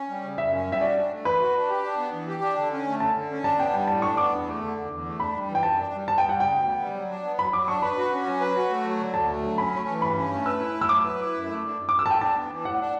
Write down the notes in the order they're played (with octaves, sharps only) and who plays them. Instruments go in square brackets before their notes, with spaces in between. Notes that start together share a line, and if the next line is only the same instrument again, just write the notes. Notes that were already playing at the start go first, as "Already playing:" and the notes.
Already playing: [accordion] C#4
G3
C#3
[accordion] F#2 [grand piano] E5
[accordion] C#4
G3
[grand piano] E5
[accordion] F#4 [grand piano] D5
[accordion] D4
A3
[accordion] E3 [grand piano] B4
[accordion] F#4
D4
G4
D4
B3
E3
G4
D4
D3
C#4
A3
[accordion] D3 [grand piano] A5
[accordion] D3
C#4
[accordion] D4 [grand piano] A5
[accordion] B3 [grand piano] G5
[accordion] G3 [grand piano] G5
[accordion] A2 [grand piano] A5
[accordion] D4 [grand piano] C#6
[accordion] B3 [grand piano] D6
[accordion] E2
A3
D3
E2
E2
A3
[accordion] D4 [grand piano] B5
[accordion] G3
E3
[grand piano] G5
[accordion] F#2 [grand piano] A5
[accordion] D4
G3
[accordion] B3 [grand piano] A5
[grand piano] G5
[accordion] G3
[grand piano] F#5
[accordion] C#3 [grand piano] G5
[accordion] D2
B3
G3
F#3
D4
B3
[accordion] F#3 [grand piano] B5
[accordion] F#3 [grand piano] D6
[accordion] D4 [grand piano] C#6
[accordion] B4 [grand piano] B5
[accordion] F#4
C#4
F#3
B4
F#4
A3
F#3
D3
[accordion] D2 [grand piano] A5
[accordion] A3
F#3
[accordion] C#4 [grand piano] B5
[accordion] A3
E3
[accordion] G2 [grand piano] B5
[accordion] C#4
A3
[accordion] B4 [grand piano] E6
[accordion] E4
A3
[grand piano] E6
[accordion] F#3 [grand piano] D6
[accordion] B4
E4
F#2
A3
D3
F#2
[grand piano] D6
[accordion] F#2
[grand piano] E6
[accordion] A3 [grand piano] G5 A5
[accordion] D4 [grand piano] A5
[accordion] B3
E3
[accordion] A2 [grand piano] F#5
[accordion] D4